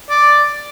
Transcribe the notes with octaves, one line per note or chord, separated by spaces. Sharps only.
D5